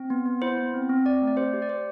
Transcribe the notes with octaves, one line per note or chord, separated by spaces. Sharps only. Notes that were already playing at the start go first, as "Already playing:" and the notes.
Already playing: C4
B3
B3
E4 C5
B3
C4
C4
C4 D5
A3
D5
G4 C5
G4
D5
G4 C5